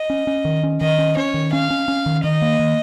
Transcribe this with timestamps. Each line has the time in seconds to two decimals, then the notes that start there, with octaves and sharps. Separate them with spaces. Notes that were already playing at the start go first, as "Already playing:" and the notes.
Already playing: D#5
0.10 C#4
0.27 C#4
0.45 D#3
0.63 C#4
0.81 D#3 D#5
0.98 C#4
1.17 C#4 C#5
1.34 D#3
1.52 C#4 F5
1.70 C#4
1.88 C#4
2.06 D#3
2.24 D#3 D#5
2.42 A#3
2.59 D#3